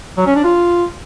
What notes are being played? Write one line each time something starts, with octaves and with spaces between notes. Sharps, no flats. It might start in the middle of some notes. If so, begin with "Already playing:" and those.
F#3
C#4
D4
F4